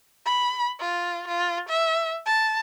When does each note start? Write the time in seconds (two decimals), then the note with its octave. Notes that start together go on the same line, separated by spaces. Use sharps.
0.26 B5
0.79 F4
1.28 F4
1.69 E5
2.26 A5